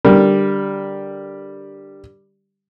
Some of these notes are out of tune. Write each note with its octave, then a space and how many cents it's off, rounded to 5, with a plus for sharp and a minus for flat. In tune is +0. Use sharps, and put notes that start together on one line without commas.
D3 +0 G3 +0 A#4 +0